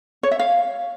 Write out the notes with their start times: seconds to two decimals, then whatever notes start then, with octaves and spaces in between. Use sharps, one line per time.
0.23 C#5
0.31 E5
0.39 F5